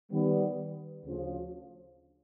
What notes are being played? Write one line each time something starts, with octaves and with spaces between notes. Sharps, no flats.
D#3 G3 B3
D2 C#3 F3